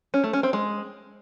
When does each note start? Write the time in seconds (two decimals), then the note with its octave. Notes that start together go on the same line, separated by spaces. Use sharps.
0.14 C#4
0.24 A3
0.33 C#4
0.43 C4
0.53 G#3